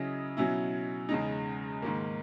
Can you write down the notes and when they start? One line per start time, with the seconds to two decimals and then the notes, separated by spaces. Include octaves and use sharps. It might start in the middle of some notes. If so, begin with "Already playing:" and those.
Already playing: C#3 F#3 C#4 E4 D#5
0.37 B2 F#3 C#4 E4
1.09 E2 C#3 G#3 D#4
1.82 G#2 D#3 A#3